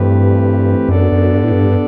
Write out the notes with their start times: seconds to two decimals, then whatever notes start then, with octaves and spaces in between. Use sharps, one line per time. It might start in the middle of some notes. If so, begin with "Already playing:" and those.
Already playing: G2 E3 A3 C4 G4 B4
0.88 F#2 B3 D4 A4 D5
1.12 F#2
1.35 G2
1.44 A2
1.52 G2